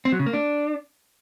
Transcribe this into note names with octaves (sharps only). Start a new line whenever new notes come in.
C4
F#3
C#3
A#3
D4